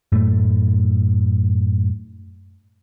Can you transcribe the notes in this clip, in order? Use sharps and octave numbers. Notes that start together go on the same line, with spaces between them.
F#2 A2 A3